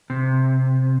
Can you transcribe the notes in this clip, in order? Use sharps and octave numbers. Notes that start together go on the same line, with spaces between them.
C3